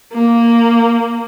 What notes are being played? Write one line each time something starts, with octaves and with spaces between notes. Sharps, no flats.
A#3